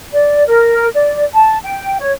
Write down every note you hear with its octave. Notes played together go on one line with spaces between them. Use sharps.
D5
A#4
D5
A5
G5
C#5